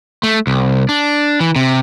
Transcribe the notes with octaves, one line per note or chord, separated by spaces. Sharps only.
A3
C2
D4
E3
C3